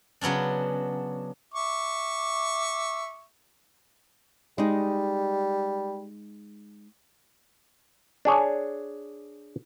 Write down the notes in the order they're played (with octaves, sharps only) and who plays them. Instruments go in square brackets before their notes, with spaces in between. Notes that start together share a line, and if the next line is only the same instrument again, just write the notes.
[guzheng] C#3 F#3 B3 C#4 D4
[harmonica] E5 C#6 D6
[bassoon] G3 [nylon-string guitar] G#3 D#4
[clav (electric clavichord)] D4 G#4 C#5